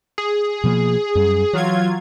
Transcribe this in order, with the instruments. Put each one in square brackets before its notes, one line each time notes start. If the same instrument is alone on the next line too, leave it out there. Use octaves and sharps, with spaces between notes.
[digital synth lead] G#4
[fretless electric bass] B2 F3 A#3
F#2 G3
[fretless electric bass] E3 [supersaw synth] F#3 F4 G#6